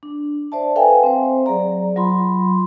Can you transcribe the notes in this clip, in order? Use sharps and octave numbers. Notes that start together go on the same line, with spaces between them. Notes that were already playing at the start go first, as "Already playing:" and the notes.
D4
C5 D5 E5 A5
A4 B4 E5 F5 G5 G#5
C4 C5
F#3 G#4 D5 A#5
F#3 F4 B5 C6